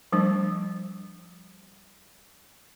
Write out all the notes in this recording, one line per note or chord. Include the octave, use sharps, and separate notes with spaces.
F3 G3 A3 D4